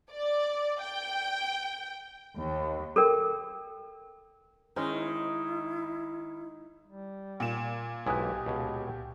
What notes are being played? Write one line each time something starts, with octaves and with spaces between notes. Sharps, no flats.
D5
G5
D#2
A4 A#4 G5
D#3 G#3 C#4 D#4 E4
G3
A#2 E7
B1 G#2 E4 G4 G#5 D#6 F#6
C#2 B2